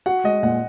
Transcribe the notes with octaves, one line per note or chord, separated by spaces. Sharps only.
F#4 F#5
G#3 D#5
A#2 F#5